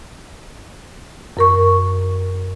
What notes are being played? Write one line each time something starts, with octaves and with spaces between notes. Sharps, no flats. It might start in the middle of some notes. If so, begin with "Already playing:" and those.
F#2 A#4 C#6